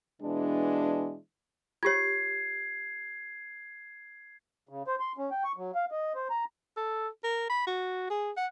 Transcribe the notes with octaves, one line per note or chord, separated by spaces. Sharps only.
B2 E3 G#3 D4
F4 G4 C#5 G#6 C7
C#3
C5
C6
C#4
G5
C#6
F#3
F5
D#5
C5
A#5
A4
A#4
B5
F#4
G#4
F#5